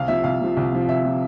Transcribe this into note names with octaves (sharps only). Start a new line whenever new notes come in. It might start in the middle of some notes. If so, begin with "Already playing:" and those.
Already playing: C2 F5
C3 F3 E5
C2 F5
C3 F3
C2
C3 F3
C2 E5
C3 F3